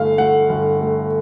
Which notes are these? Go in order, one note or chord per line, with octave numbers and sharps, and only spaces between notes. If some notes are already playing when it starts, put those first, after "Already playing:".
Already playing: G1 A3 F5
A3 F#5
G1
A3